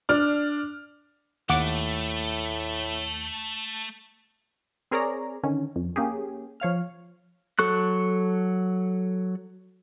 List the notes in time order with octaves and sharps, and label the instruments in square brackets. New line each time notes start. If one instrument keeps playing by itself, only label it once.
[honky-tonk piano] D4 F6
[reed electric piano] D#2 [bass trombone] A2 [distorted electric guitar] A3 [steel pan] F#5 D6
[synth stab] C4 G#4 A#4 C#5 D5 A#5
D3 D#3 C#4
F2
A#3 C#4 G4 G#4
F3 C#5 F5 F6
[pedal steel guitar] F#3 A4 C#6 F#6